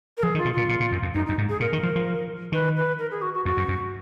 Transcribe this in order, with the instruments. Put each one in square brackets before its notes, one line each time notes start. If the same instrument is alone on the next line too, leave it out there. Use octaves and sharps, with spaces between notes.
[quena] A#4
[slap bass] F3 [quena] G#4
[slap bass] D#3
[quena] F4
[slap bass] B2
[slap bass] A#2 [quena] F4
[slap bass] A#2
A#2
F#2
F2
[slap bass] F#2 [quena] D#4
[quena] D#4
[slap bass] F#2
G#2
[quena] G#4
[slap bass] A#2 [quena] A#4
[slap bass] D#3
F3
F3
[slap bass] D#3 [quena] B4
[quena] B4
A#4
G#4
F#4
F#4
[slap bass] F2 [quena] F#4
[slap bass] F#2
F#2